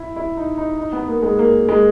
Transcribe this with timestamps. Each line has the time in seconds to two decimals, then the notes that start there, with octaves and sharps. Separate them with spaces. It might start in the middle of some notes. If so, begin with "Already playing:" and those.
Already playing: E4
0.16 E4
0.37 D#4
0.58 D#4
0.78 D#4
0.93 B3
1.08 A#3
1.23 G#3
1.39 A#3
1.69 G#3